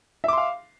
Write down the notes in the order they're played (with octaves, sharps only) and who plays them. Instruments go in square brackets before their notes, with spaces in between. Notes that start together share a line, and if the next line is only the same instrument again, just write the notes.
[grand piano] E5
D6
C6
F5